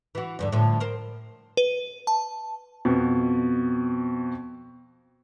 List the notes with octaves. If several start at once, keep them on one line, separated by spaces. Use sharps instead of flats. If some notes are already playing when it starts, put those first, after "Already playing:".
E3 F#4
E2 G2 D3
A2 D3 F3
A#4 C5
B4
A5
F2 B2